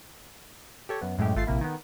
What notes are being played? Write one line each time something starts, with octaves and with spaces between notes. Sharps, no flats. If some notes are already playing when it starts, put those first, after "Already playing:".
G4 A4 C#5
F#2 B3
F#2 A2 G#3 A3 G4
G#1 A3 F4 A6 C7
A#1 C3 A#3 E4
D#3 B3